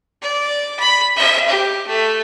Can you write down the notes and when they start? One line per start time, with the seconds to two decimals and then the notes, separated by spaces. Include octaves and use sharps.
0.22 D5
0.79 B5
1.16 E5
1.48 G4
1.87 A3